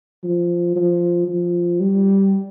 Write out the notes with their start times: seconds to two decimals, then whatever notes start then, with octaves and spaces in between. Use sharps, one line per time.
0.24 F3
0.76 F3
1.28 F3
1.80 G3